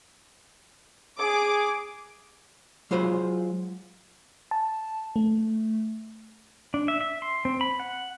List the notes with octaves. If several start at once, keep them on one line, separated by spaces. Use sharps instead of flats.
G#4 D6
F#3 G#3 F4 C5 B5
A5
A3
D4
E5
E5
C6
C4
B5
F#5